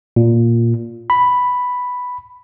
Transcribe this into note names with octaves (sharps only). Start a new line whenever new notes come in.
A#2
B5